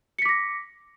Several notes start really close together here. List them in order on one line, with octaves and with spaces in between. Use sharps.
C#7 B6 D6 A#6